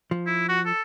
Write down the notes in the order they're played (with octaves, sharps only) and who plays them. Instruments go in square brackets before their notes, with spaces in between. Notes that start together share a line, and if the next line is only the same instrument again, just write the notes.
[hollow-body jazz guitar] F3
[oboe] E4
F#4
A4